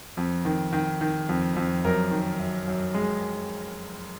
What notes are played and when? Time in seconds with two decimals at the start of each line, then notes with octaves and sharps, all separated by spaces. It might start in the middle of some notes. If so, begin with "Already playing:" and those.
0.17 F2
0.45 D#3
0.73 D#3
1.01 D#3
1.29 F2
1.56 F2
1.84 F#2 A#4
2.11 D#3
2.39 F#2
2.68 F#2
2.94 G#3